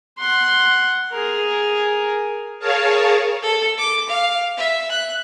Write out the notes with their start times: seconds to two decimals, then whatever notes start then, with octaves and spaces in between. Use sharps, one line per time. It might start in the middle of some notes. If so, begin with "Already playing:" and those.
0.18 F#5 C6
1.12 G#4 A#4
2.59 G#4 A#4 C#5 F5 A5
3.42 A4
3.78 D6
4.09 F5
4.57 E5
4.91 F#6